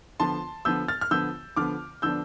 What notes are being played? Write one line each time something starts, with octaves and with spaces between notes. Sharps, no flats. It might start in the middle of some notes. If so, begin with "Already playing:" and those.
D3 F3 B3 A5 C6
D3 F3 B3 E6 G6
F6 A6
F6
D3 F3 B3 E6 G6
D3 F3 B3 D6 F6
D3 F3 B3 D4 E6 G6